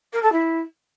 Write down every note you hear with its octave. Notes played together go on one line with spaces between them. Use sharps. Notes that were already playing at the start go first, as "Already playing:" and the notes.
A#4
A4
E4